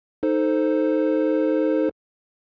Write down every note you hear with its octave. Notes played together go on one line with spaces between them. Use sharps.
D#4 A4 C5